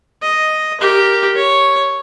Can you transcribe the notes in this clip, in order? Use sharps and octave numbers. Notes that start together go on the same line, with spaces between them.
D#5
G4 A#4
C#5